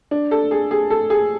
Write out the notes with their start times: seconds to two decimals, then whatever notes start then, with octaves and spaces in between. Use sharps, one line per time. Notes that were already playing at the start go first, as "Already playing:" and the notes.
0.11 D4
0.31 A4
0.51 G#4
0.71 G#4
0.90 A4
1.10 G#4